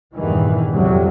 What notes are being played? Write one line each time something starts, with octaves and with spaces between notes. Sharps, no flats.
A#1 E2 G2 D#3 E3
C2 F2 C3 F#3 G3